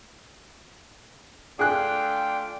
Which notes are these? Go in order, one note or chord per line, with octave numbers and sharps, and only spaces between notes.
A3 D4 F4 G#4 G5 F#6